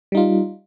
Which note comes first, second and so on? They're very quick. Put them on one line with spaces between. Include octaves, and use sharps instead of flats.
G3 D#4 F4